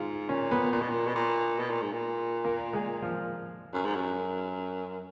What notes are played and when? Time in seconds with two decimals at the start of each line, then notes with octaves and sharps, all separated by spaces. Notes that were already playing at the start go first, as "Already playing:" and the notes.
Already playing: G#2 F4
0.29 A#2 C#4
0.51 B3
0.72 A#2
0.81 B2
0.90 A#2
1.07 B2
1.15 A#2
1.59 B2
1.70 A#2
1.81 G#2
1.93 A#2
2.45 A#3
2.73 G#3
3.02 F3
3.74 F#2
3.85 G#2
3.95 F#2